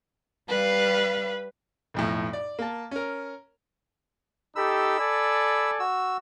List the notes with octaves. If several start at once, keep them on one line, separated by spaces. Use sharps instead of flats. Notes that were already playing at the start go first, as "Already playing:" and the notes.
G3 B4 F5
B1 F2 A2
D5
A#3 A5
C#4 A#4
D#4 G4 A4 B5 E6
A4 D5 G#5
F#4 E6